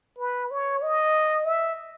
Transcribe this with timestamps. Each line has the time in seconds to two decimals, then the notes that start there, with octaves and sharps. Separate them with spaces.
0.18 B4
0.51 C#5
0.82 D#5
1.46 E5